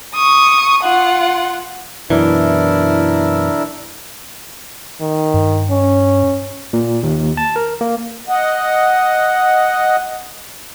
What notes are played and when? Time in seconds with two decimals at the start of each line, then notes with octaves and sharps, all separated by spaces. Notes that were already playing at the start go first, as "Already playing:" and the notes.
0.14 C#6 D#6
0.83 F4 F#5
2.10 F#2 B2 E3 D4 E4 A#4
5.01 D#3
5.34 G2
5.71 C#4
6.73 A#2
7.03 D#2
7.37 A5
7.56 A#4
7.81 A#3
8.29 D#5 F#5